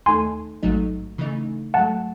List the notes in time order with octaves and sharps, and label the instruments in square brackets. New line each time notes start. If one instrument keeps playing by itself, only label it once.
[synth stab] D#2 D#3 A3 D#4 A4 [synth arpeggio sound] G#5 C6
[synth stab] A1 G#2 F#3 A3 D#4
C#3 E3 A3 D#4
[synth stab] G#2 F#3 A3 [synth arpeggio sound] F#5 A5